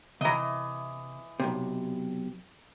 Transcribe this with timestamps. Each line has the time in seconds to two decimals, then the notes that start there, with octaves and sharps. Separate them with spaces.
0.21 C3 E3 D#5 A#5
1.40 B1 E2 C3